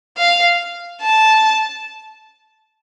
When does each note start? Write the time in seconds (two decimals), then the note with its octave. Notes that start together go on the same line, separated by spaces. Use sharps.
0.17 F5
1.02 A5